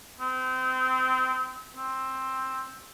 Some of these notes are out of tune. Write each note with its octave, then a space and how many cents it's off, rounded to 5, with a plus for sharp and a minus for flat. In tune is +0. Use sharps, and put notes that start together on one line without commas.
C4 -25
C4 +10